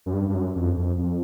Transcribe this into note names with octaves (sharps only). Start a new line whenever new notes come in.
F#2
G2
G2
F#2
F2
F2
F2